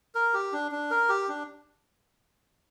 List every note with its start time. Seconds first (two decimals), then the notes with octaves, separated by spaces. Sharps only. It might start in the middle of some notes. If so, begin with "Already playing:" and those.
0.15 A#4
0.34 G4
0.53 D4
0.72 D4
0.91 A#4
1.09 G4
1.29 D4